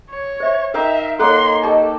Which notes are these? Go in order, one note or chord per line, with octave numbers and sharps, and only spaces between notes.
C#5
C5 E5 F5
D#4 A#4 E5 F5 G5
A#3 D#4 A4 C#5 F#5 C6
G4 A4 D#5 G5 C#6